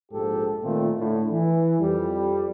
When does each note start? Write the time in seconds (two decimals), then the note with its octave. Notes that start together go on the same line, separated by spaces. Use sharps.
0.12 A#1 G#2 F3 G4 A4
0.63 A#2 D#3 A3 C4 F4
0.98 A2 D3
1.31 E3
1.80 F2 G3